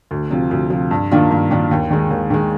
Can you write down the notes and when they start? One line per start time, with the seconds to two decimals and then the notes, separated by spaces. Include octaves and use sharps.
0.11 D2
0.31 C3 F3
0.51 D2
0.70 C3 F3
0.91 G2
1.11 D#3 A#3 D4 F4
1.31 G2
1.51 D#3 A#3 D4 F4
1.71 D#2
1.91 D#3 G#3
2.11 D#2
2.30 D#3 G#3